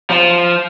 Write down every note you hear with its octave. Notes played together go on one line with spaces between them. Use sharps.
F3